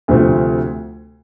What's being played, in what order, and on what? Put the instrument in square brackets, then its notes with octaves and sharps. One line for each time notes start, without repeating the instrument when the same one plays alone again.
[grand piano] D2 C3 F3 A3 C4